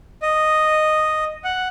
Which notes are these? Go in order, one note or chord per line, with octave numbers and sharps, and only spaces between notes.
D#5
F#5